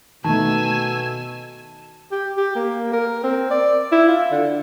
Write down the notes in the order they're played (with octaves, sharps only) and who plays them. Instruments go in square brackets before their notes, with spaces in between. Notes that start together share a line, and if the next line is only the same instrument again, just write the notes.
[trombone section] B2 [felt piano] D#3 A3 [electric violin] G#5 E6 [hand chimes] A5
[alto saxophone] G4
G4
A#3
A#4
C4
D5
E4
F4
D3